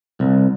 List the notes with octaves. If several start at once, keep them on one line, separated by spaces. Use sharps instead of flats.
C2